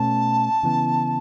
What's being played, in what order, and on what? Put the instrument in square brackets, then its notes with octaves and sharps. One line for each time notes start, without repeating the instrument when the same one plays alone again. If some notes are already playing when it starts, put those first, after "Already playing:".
Already playing: [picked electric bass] B2 A3 C#4 [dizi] A5
[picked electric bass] C#3 E3 B3